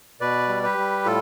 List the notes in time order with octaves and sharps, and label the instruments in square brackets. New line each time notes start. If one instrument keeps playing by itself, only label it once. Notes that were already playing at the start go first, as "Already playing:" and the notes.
[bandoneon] B2 B4 D5
G3
G4 B4
G3
A2 F4 A4